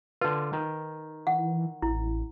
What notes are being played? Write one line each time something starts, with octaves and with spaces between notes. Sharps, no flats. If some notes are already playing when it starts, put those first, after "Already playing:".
D3 F4 B4
D#3
E3 F#5
A1 E4